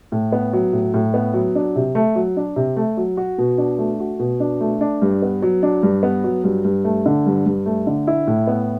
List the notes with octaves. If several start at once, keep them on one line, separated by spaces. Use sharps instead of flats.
A2
B3
F#3
A2
A2
B3
F#3
D4
C3
A3
F#3
D4
C3
A3
F#3
F#4
B2
D4
A3
F#4
B2
D4
A3
D4
G2
B3
F#3
D4
G2
B3
F#3
G2
G2
A3
D3
G2
G2
A3
D3
E4
A2
B3